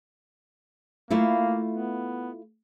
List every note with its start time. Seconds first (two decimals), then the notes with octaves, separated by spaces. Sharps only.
1.11 A3 A#3 E4 F4
1.70 B3